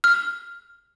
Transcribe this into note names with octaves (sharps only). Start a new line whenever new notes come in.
F6